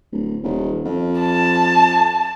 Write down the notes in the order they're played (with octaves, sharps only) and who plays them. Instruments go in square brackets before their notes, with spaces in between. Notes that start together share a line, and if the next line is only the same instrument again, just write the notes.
[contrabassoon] D1
D#1
F2
[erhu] A5